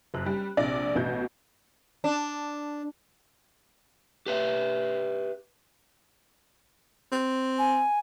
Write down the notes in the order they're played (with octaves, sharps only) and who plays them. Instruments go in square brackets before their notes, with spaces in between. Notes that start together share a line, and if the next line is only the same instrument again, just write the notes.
[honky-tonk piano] F#1 F#2 F#6
G3
A#1 C3 D4 D5 A#6
A1 B2 F#4 G6
[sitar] D4
[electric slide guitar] G4 B4 E5
[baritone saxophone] C4
[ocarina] G#5